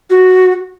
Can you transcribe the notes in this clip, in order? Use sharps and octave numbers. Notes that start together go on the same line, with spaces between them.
F#4